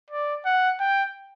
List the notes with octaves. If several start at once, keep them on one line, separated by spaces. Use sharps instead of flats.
D5
F#5
G5